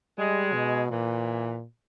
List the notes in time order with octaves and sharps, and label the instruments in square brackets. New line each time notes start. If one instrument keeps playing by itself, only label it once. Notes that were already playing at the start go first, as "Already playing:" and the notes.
[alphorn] G3 [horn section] G#3
[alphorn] B2
[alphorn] A#2 [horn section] E3